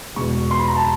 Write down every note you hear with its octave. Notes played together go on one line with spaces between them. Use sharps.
E2 B2 G#3 C#6
C6
B5
A#5
A5